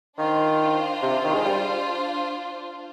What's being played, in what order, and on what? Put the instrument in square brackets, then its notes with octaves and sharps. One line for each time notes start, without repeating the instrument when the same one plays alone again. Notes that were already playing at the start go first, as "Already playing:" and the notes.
[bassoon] D#3 [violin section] D4 F4 C5
[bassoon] C3
D#3
G#3
G3